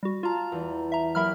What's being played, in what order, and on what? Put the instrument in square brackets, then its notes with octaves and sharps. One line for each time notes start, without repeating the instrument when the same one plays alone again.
[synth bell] G3 F#4
[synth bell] F4 A#5 [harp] F5 A5
[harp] E2
[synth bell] E5 A#5
[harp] F#3 A#3 G4 [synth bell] E5 B5 F6